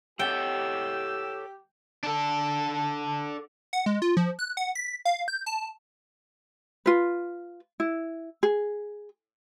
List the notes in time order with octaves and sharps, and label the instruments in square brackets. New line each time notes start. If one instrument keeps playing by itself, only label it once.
[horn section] G4 [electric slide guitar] A4 C#5 F#5 [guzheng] G5 [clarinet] E6
[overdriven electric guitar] D4 A4
[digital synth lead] F#5
G#3
F4
F3
F#6
F#5
B6
F5
G6
A5
[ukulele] F4 B4
E4
G#4